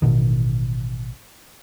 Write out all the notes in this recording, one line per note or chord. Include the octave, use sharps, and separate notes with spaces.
A1 B2 D#3